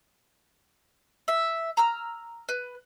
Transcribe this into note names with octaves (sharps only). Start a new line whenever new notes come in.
E5
A#5 E6 F6
B4